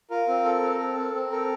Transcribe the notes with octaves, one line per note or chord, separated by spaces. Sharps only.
F4 A#4
C4
A4
C4
A4
C4
C4
A4 A#4